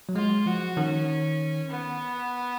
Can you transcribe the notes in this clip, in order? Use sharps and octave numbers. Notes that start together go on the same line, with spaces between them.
F#3
G#3 F4
F3 F#4
D#3 C#4
B3